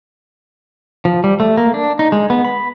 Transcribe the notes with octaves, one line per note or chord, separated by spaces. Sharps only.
F3
G3
A3
A#3
D4
D#4
G#3
B3
B5